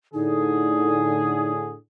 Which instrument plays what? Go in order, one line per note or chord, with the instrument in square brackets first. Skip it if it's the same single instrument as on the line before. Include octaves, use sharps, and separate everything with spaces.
[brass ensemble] A2 D3 G#4 [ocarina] D#4